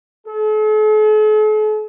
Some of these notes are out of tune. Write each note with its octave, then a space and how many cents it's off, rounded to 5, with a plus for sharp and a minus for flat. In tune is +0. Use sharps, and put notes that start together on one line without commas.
A4 -45